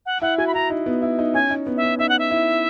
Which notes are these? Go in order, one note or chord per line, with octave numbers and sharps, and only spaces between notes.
F#5
E4 F#5
F#4 G#5
B5
E4 A#5
D#4
B3
E4
D#4
C#4 G#5
D#4
B3
E5
C#4
D#4 E5
F#5
E5
E4